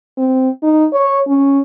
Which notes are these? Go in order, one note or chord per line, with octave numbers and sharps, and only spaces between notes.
C4
D#4
C#5
C#4